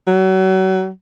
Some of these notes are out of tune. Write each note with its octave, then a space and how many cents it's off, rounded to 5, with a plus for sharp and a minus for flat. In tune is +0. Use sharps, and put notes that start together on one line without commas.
F#3 +35